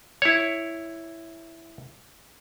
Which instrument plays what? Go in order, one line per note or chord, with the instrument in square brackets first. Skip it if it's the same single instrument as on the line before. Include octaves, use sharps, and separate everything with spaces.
[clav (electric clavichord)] E4 C#5